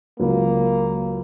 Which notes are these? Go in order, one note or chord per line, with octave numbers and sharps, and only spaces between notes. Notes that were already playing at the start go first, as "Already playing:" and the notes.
C#2 F#3 A#3